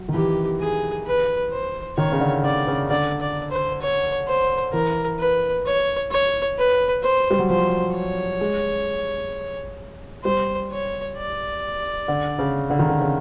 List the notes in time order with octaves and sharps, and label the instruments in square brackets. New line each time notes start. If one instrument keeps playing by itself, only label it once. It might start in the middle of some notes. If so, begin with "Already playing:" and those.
Already playing: [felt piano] F#3
D#3
[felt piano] E3 [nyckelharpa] G4
[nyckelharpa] G#4
B4
C5
[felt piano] D#3 [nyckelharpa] C#5
[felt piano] C#3
D3
[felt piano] D3 [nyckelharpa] D5
[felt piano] C#3
[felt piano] D3 [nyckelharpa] D5
[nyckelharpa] D5
C5
C#5
C5
[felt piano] E3 [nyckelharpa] A#4
[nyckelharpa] B4
C#5
C#5
B4
C5
[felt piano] G3
F#3
[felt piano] F3 [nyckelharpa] C5
[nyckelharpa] C#5
[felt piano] G#3
[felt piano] G3 [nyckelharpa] C5
[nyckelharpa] C#5
D5
[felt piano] D3
C#3
D3
D#3
D3
C#3